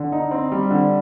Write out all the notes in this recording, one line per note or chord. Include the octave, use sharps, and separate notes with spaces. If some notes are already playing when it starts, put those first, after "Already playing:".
Already playing: D3
D#4
C4
G3
D3